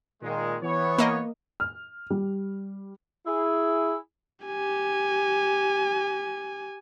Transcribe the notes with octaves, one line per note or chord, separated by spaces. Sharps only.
A#2 D#3 G#3
E3 B3 C#5
A#3 D#5
F6
G3
E4 G#4
G4 G#5